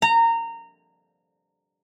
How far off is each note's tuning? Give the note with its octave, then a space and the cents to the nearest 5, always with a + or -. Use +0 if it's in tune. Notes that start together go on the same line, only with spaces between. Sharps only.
A#5 -20